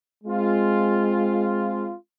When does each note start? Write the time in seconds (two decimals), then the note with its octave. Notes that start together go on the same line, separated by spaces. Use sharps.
0.24 G#3 C4 F4